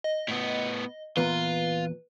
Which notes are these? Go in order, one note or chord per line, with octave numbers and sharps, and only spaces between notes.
D#5
A2 B3
E2 A#2 F4 B4